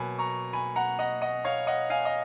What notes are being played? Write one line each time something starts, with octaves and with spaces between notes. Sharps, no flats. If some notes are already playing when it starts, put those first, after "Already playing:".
Already playing: B2 F#3 A#3 G#5 B5
A#5 C#6
G#5 B5
F#5 A#5
D#5 F#5
D#5 F#5
C#5 F5
D#5 F#5
F5 G#5
D#5